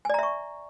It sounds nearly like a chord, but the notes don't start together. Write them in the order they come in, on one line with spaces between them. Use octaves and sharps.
G#5 D5 A#5 E5 C#6